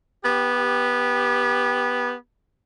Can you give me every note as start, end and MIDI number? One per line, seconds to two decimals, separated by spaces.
0.24 2.14 59
0.24 2.14 67